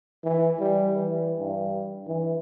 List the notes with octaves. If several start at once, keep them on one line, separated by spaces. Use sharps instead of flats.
E3
G3
E3
G2
E3